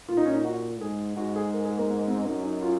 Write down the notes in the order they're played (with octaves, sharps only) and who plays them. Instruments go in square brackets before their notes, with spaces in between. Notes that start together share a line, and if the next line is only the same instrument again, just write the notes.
[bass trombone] A#2 [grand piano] F4
[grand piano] D#4
C#4
D#4
F#4
[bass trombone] G#2 [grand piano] G#4
[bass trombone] G#2 [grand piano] F#4
[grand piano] G#4
A#4
G#4
A#3
A#3
C4
[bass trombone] F#2 [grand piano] D#4
[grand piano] D#4
F4